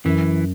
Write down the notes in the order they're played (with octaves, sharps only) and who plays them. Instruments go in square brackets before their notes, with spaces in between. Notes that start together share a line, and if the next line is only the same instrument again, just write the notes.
[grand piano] F#2 [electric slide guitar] E3